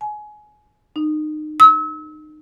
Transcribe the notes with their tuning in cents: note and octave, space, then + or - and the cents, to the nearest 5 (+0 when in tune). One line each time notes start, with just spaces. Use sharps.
G#5 +25
D#4 -30
E6 -35